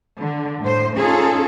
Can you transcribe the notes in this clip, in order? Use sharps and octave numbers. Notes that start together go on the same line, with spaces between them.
D3
A2 C5
C#4 D#4 F4 G#4 A4